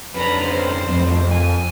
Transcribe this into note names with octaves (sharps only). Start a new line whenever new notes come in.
F2 C#4 D4 B4 A#5
C5
F2 A2 F3 C4
G#5